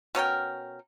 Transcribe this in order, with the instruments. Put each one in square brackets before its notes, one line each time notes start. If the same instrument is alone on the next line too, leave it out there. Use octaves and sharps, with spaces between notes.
[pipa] B2 C#4 A#4 G5